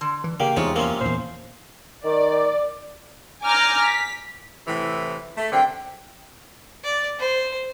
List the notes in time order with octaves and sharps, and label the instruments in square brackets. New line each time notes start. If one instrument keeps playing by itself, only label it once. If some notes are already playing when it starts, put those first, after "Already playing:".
[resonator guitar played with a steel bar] D3
[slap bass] E3
[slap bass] C#3 [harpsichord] A#3 [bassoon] G4
[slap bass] E2 [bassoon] C3 [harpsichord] G#3 [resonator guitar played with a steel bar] D#4 F4 C#5
[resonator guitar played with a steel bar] G2 F3 [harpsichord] A#3 C#4
[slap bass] E2 A#2 [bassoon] C5
[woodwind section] D#3 [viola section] D5
[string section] G#5 A#5 D6 F6 G6
B6
[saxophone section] A2 C3 E3
A3
[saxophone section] F#2 D3 C4 [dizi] G5
[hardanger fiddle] D5
C5